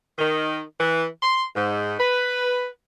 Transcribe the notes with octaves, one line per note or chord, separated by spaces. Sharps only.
D#3
E3
C6
G#2
B4